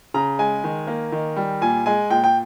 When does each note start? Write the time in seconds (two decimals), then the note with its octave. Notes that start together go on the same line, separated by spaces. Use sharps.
0.14 C#3 A#5
0.39 G#3 G#5
0.64 D#3
0.87 A#3
1.12 D#3
1.36 G3
1.61 A#2 G#5
1.86 G#3 G#5
2.10 A#2 G5
2.24 G5